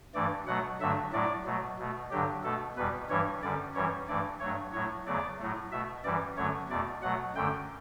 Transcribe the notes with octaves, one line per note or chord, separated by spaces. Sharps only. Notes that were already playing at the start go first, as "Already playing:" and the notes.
G2 E3 A3 D5
B2 F#3 A3 F#5
G2 D3 F#3 A3 E5
A2 F#3 A3 D5
B2 F#3 A3
B2 A3
G2 D3 F#3 G4
B2 A3 A4
E2 B2 G3 B4
G2 E3 G3 C#5
F#2 D3 G3 D5
F#2 E3 G3 C#5
G2 E3 A3 D5
G2 F#3 A3 C#5
A2 F#3 A3 C#5
E2 C#3 F#3 A3 D5
A2 F#3 A3
B2 A3 E5
F#2 E3 G3 D5
F#2 D3 F#3 A3 C#5
E2 B2 A3 D5
B2 F#3 A3 F#5
F#2 D3 A3 G5